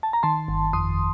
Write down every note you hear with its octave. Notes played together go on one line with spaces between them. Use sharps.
A5
A#5
D#3 A5 C6
G1
F2 C6 D#6